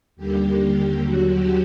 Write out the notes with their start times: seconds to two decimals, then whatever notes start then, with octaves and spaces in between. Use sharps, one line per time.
0.16 D#2 D3 G3 A#3 G4
0.59 G4
1.00 D#2 D3 F#3 F#4
1.29 G4